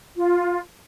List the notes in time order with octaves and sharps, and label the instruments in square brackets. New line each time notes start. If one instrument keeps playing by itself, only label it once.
[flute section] F4